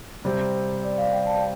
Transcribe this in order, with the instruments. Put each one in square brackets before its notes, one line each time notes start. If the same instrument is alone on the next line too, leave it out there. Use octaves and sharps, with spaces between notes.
[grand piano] C3 G3 C4 G4 [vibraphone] C5
[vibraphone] D5
F5
G5
A5
G5